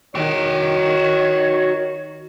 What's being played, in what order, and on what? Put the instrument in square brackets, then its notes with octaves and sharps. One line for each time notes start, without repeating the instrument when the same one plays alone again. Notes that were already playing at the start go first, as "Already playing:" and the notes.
[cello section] D#3 [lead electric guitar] F#4 G5 [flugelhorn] C#5